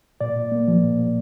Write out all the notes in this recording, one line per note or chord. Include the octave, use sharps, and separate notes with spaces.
A#2 D5
A#2
A#3
F3
A#2
A#2